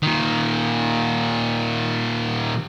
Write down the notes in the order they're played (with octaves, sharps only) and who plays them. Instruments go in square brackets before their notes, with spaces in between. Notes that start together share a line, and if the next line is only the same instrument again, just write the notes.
[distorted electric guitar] A#2 D#3